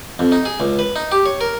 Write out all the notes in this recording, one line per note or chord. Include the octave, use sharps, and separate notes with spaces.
F2
D#4
G#4
C#2
B4
D#4
G4
C#5
A#4